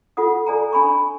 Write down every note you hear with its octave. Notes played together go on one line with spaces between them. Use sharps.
F4 A4 F#5 D#6
A4 D5 G#5 A#5
D4 G#5 B5 C#6